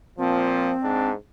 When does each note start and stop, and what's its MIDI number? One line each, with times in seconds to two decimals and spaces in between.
0.18 0.74 46
0.18 0.74 53
0.18 1.10 60
0.83 1.12 44
0.83 1.12 62